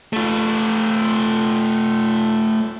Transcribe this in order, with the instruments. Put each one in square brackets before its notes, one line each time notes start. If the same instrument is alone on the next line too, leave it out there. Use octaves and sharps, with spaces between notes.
[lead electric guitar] A3 F4